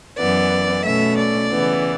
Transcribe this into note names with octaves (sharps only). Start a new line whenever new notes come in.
F#2 E3 B3 D5
B2 A3 C#4 E5
D5
C#3 E3 B3